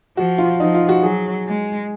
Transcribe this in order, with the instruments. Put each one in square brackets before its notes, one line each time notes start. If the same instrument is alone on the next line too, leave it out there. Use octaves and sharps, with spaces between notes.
[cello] F3 [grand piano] F#4
[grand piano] F4
[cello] F3 [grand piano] D#4
[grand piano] F4
F#4
[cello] F#3 [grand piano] G#4
[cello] G#3